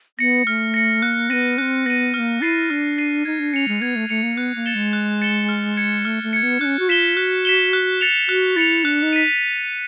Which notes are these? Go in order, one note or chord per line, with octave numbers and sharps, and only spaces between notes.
B3 A#6 C#7
A3 F6
A#6 C#7
A#3 F#6
B3 C4 A#6 D#7
C4 C#4 F#6
B3 A#6 D#7
B3 F6
A#3
E4 A6 C7 D#7
D4 F6
A6 C7 D#7
D#4 G#6
D4
C#4 C#7 F7
G#3
B3 G#6
A3
A3 C#7 F7
A#3
B3 F#6
A#3
A6 C#7 E7 G7
G#3
F#6
A6 C#7 E7 G7
F6
G#6 C#7
A3 F6
A3
G#6 C#7
B3
C#4 D4 F#6
F#4
F4 B6 E7 G7
F#4 F#6
B6 E7 G7
F#6
A6 C#7 F7
F#4 F#6
E4 A6 C#7 F7
D4 F#6
D#4
B6 D#7